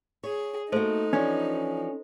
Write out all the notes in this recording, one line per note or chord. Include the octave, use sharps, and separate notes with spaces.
G#4 C#5
A3 A#3 D#4 F#4 A4 C5
E3 F3 C#4 D4